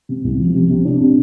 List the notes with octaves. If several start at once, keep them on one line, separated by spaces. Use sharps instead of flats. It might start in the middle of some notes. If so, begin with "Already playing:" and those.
C3
C2
F3
C3
C3
D4
C3